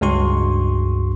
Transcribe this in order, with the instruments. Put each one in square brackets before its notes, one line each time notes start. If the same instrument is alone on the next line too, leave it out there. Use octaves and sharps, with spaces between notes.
[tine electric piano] C#2 G2 G#3 F#4 C6 C#6